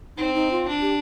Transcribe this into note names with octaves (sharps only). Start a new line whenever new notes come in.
C4 D#4
D#4
F4
D4
G4